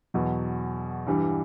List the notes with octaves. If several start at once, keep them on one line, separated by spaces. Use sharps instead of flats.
E2 B2 F#3
G2 E3 G3